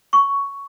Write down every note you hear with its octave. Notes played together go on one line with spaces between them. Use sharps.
C#6